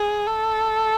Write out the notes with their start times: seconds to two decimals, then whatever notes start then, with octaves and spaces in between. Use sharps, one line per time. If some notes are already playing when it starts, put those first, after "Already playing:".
Already playing: G#4
0.27 A4